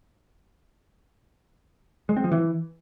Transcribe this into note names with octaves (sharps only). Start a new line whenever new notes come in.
G#3
C4
F3
E3